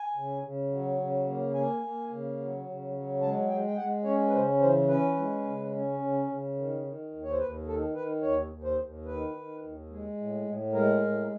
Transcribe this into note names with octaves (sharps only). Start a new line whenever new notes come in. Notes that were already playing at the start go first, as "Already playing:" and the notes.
Already playing: G#5
C#3
C#3
F#3
C#3
A#3
A#3 G#5
A#3
C#3
F#3
C#3
F#3
G#3 A5
G#3 G5
G5
G#3 F#5
C#4 C#5
B4
C#3 C5
E3 C5
C#4 B4
G#3
C#3
C#4
C#3
C#3
D#3
D#3
D#2
C#5
C5
D#2 B4
D#3 A4
D#3 B4
D#2 C#5
D#2
C5
D#2
D#3 B4
D#3
D#2
G#3
A2
A2
G#3 A#4
A2